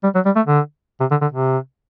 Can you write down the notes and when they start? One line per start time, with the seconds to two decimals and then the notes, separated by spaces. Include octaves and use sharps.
0.04 G3
0.15 F#3
0.26 G3
0.36 A3
0.47 D3
1.00 C3
1.11 D3
1.22 D3
1.32 C3